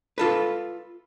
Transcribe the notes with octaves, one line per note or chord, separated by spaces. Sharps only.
F4 A4 B4